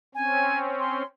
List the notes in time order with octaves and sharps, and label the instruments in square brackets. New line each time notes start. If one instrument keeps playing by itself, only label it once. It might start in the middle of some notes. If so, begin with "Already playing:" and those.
[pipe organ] C4 C#4 [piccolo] G#5
[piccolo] C6